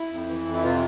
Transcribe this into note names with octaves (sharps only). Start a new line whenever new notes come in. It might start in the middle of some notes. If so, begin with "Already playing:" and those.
Already playing: E4
F2
E3
F2
E4
C3 F4